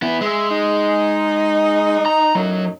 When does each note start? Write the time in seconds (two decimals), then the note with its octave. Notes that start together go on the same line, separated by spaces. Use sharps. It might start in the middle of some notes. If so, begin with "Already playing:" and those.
0.02 B3 E4
0.21 G#3 E5
0.50 D#4
2.06 A#5
2.35 F#2 A2 F#3 D#4